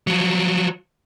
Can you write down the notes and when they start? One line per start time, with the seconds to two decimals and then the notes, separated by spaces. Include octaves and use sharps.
0.07 F3 F#3